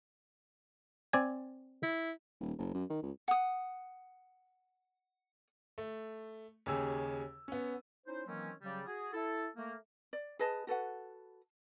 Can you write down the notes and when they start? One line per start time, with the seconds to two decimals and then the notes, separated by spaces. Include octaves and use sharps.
1.13 C4 D5 G#5
1.83 E4
2.40 D#1
2.58 F#1
2.75 F#2
2.90 D#3
3.03 C#2
3.28 F#5 D#6
5.78 A3
6.66 D#2 C#3 G4 G#4 C#5 E6
7.48 B3 C#4
8.07 C#4 D#4 E4 C5
8.26 D#3 E3 F#3 A#3 C4 C#4
8.62 C#3 F#3 G3
8.86 F#4 G#4
9.14 E4 A4
9.56 A3 A#3
10.13 D5
10.39 G#4 B4 D#5 A5
10.67 F#4 A4 B4 F#5